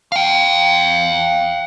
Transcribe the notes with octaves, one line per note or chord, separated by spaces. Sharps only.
F5 G5